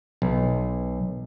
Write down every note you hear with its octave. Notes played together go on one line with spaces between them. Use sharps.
B1